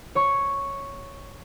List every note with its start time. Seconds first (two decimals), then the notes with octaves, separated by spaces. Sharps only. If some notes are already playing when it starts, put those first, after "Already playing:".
0.15 C#5 C#6